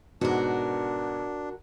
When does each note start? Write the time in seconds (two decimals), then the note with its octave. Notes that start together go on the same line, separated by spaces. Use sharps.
0.21 G#2 B2 D4 F#4 A#4